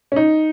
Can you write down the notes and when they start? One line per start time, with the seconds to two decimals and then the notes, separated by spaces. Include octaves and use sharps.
0.12 C#4
0.16 D#4